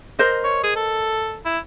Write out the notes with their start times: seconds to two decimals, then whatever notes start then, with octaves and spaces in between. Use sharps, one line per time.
0.19 A#4 C5 D#5
0.44 C#5
0.64 G#4
0.76 A4
1.45 E4